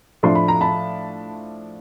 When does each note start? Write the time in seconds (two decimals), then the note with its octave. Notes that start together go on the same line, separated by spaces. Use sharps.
0.23 A2 F3 A3 D4 C6
0.35 B5
0.48 A#5
0.61 A5 B5